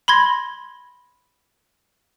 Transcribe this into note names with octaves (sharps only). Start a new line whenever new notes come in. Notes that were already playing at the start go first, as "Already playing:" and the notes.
B5 C6 G#6 A#6